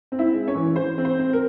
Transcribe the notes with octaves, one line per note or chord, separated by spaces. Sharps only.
C4
E4 E5
G#3
C#4 C#5
E3
E3 C5
C4
C5
C4
A#4